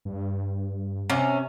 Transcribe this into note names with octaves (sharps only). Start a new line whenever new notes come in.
G2
C3 C#4